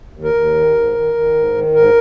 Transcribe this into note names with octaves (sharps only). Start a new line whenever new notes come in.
D#2
A#4
D#2
D#3
G#2
D#3
D#3
G#2
D#3
G#2 A#4